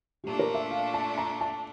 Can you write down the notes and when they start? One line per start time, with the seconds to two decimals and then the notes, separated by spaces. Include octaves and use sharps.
0.24 A#2 A3 D4 G4
0.39 A#4
0.54 E5
0.71 F5
0.94 A5
1.18 A#5
1.41 A5